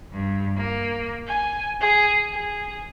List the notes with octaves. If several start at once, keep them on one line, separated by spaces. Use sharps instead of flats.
G2
A#3
G#5
G#4
G#4